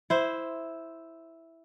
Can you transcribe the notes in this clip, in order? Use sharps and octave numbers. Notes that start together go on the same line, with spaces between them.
E4 C5